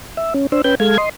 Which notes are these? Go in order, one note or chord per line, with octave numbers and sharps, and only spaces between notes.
E5
C#4
D4 C5 E6
C#4 B4 G5 G6
G#3 A4 F5 G#6
D#5 C6